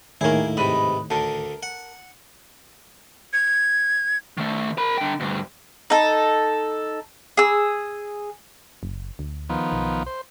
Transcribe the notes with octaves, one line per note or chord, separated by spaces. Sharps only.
D#2 A2 D#3 A#3 E4 G#4 A#4
G#2 C3 B4 D#5 B5
D2 D3 A4 A#4
F#5
G#6
D#3 A3
A#4 B5
D3 G5
D2 G2
D#4 A4
G#4 E6
F#1
D2
D#3 F3 B3
B1
C5